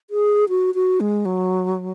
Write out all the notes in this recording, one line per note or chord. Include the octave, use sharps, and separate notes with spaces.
G#4
F#4
F#4
G#3
F#3